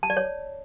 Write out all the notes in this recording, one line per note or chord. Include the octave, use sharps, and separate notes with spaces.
A5
D5
C#5